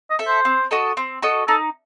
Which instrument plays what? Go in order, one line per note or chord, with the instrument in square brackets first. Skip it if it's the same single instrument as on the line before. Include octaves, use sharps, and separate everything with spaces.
[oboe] D#5
[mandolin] A4 E5
[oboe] C5
[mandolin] C4
F#4 A4 D#5
C4
F#4 A4 D#5
[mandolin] D#4 [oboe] A4